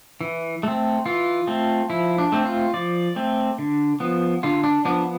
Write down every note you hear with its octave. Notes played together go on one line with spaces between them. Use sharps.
E3
A3 C4
E3 F4
A3 C4
F3 E4
D4
A3 C4
F4
F3 D5
A3 C4
D3
F3 B3
D3 F4
D4
F3 B3 D4